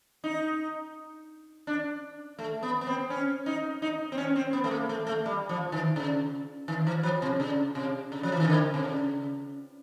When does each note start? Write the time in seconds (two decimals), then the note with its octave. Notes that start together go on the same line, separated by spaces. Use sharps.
0.24 D#4
1.67 D4
2.39 A3
2.63 B3
2.81 B3
2.87 C4
3.10 C#4
3.46 D#4
3.82 D#4
4.12 C4
4.18 C#4
4.36 C4
4.53 B3
4.64 A3
4.71 A#3
4.89 A3
5.07 A3
5.26 G3
5.49 F3
5.72 D#3
5.96 C#3
6.68 D#3
6.87 E3
7.03 F3
7.22 C3
7.40 C#3
7.75 C3
8.12 C#3
8.23 F3
8.32 E3
8.40 D#3
8.48 D3
8.74 C3
8.83 C#3